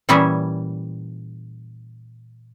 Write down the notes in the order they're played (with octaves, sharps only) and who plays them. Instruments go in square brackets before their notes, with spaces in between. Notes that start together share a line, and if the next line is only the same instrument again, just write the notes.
[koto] A#2 E3 G3 C#4 G#4 E5